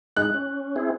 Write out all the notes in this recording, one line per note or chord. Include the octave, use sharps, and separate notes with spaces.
G#3 D#4 F#6
C#4
C4 E4 G#4